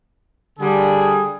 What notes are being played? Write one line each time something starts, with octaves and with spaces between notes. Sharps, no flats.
D3 G3 G#4